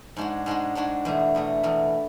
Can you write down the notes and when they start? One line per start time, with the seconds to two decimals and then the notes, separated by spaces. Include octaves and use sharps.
0.17 G#2 G#3 D4 F#4
0.46 G#2 G#3 D4 F#4
0.75 G#2 G#3 D4 F#4
1.05 E2 B2 A3
1.35 E2 B2 A3
1.63 E2 B2 A3